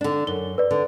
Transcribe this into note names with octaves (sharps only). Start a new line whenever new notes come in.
D3 D4
F#2 G7
B4 D5
D3